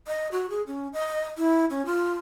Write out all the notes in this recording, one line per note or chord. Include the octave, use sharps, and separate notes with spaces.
D#5
F#4
G#4
C#4
D#5
E4
C#4
F4